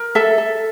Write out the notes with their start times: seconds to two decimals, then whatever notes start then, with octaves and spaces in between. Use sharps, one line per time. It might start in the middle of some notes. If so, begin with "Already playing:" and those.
Already playing: A#4
0.15 A4 E5
0.38 A4